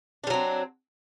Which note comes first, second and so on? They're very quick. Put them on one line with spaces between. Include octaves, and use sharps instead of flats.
D4 G3 F#3 C4